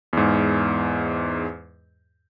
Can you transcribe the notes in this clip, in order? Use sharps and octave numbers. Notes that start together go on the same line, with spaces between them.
E2 G#2